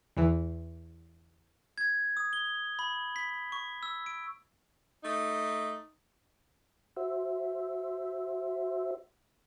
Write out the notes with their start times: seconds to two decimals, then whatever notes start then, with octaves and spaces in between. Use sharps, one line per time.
0.17 E2 E3
1.78 G#6
2.17 D#6
2.33 G7
2.79 B5
3.16 B6
3.52 C#6
3.83 E6
4.06 D7
5.04 A3 D#4
6.97 F#4 C5 E5